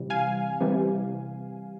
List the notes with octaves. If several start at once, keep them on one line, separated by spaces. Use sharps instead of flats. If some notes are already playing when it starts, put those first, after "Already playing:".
Already playing: C3 E3 G3
F5 G#5
C3 E3 G3